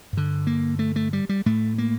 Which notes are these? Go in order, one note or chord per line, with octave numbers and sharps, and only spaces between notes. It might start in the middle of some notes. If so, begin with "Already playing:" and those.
G2 D3
A#3
A3
A3
G3
G3
A2 A3
A#3